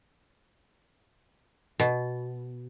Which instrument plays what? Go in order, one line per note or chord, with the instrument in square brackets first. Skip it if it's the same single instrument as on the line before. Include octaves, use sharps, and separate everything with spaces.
[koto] B2